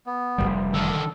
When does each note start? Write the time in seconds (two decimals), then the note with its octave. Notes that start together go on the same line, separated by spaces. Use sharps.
0.06 B3
0.38 F1 C#2 G3
0.74 D3 D#3 A4